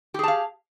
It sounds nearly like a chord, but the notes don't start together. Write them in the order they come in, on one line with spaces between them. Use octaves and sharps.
G4 G#4 A5 F5